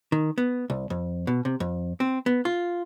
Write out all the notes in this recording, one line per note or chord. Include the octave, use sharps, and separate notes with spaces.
D#3
B3
C2
F2
B2
C3
F2
C4
B3
F4